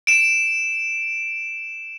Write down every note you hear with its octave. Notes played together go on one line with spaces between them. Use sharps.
D7 E7